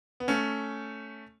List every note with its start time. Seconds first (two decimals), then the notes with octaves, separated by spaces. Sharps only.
0.20 B3
0.28 A3 C#4